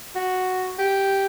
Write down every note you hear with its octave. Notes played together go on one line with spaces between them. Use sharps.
F#4
G4